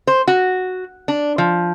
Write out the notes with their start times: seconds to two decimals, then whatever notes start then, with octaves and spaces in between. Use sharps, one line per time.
0.07 C5
0.28 F#4
1.08 D4
1.38 F3